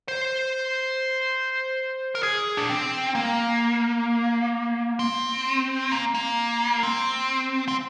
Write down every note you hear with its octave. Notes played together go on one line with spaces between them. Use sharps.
C5
A#4
G#4
D4
C4
A#3
C4
A#3
A#3
C4
C4